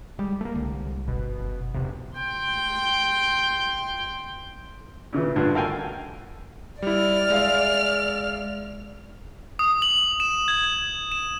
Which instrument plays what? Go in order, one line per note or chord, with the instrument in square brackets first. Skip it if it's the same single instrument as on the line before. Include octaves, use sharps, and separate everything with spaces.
[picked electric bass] G3 [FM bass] G#3
[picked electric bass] A3 A#3
[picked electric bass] C2 [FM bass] D3
[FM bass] G1 [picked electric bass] B2
[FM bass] F#1
[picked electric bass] E2 C3
[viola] G5 C6
[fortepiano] A#2 C#3 E3
G2 A#2 D3
F#4 A4 A#4 F5 G5 G#5
[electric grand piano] G3 E4 [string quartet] D5 F6
[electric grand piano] G#3 E5 F5
[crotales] D#6
F#7
E7
G#6
E7